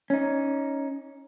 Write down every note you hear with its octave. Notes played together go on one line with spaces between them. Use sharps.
C#4 D#4